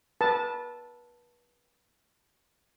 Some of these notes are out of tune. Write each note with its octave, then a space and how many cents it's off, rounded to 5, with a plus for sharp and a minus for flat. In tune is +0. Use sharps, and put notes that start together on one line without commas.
B4 -30 A5 +0